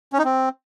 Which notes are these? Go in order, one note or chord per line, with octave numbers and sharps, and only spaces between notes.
C#4
D#4
C4